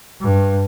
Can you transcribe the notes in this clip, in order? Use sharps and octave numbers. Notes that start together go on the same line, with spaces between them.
G2